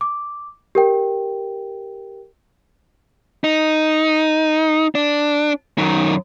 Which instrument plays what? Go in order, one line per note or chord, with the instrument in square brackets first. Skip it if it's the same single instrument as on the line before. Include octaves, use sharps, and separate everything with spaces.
[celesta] D6
G4 A#4 G5
[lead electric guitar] D#4
D4
F#2 D#3